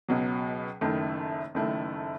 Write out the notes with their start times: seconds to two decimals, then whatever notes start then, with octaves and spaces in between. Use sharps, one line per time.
0.08 C#2 B2 F#3
0.81 F#1 F#2 D#3 A3 E4
1.55 F#1 F#2 D#3 A3 E4